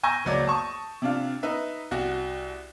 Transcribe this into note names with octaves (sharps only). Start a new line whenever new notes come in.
G#5 C#6 E6 G6 A#6
F#1 C#2 F#3 F#4 D5
A5 C#6 D#6
C3 D4 F4
D#4 B4 E5
C2 F#4